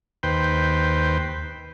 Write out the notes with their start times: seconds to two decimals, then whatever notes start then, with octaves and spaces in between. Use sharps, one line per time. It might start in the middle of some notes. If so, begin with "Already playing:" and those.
0.23 D#2 B4 C5 G5